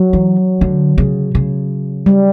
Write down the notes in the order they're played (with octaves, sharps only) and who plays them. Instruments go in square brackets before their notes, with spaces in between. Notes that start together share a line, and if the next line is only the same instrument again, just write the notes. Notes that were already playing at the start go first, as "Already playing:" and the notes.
Already playing: [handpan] F#3
[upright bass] E3
D3
C#3
C#3
[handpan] G3